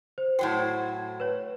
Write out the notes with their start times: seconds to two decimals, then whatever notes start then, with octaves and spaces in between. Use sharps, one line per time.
0.18 C5
0.39 A2 F#3 C5 G5
1.20 B4 C#5